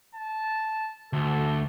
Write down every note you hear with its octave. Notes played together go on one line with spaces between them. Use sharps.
A5
D2 A4